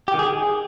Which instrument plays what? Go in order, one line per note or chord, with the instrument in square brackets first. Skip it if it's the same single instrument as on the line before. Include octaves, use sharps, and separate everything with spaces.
[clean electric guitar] G4
D#3
G#4